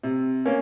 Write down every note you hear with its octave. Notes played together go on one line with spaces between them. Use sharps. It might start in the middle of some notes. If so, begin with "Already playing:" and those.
C3
A#3 C#4